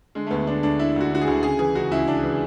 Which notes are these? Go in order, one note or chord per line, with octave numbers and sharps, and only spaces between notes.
D3 G#3
A3
D2 B3
D3 D4
D2 D4
D3 E4
D2 F#4
D3 F#4
G#4
D2
C#3 G#4
E3 G#4
C#2 F#4
C#2 E4
C#3 D4
E3